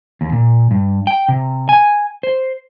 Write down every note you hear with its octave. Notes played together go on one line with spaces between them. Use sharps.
D#2
A#2
G2
G5
C3
G#5
C5